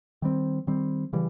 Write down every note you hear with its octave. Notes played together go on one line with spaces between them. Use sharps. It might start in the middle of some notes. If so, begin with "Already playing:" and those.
D#3 G3 C4
D#3 G3 C4
C#3 E3 G3